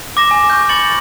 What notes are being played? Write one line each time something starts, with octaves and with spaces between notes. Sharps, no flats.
D6 A#6 E7
G#5
C#6 F6 G6
B5 C#6 D6 A6 C#7 F#7